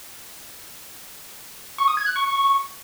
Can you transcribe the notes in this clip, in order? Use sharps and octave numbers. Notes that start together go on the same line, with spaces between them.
C#6
D#6
G#6
F#6
C#6